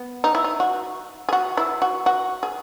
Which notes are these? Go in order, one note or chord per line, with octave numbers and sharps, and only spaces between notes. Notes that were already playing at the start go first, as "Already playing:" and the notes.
Already playing: B3
D#4
E4
D#4
F#4
G#4
F#4
E4
F#4
F#4
G#4